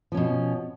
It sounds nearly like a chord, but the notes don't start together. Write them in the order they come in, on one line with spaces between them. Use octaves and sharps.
F3 C#4 B2